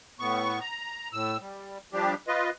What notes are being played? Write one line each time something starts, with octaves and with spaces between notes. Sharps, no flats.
A2 B3 C#6
A#5
A2 E6
G3
F3 G3 D4 G4
F4 B4 D#5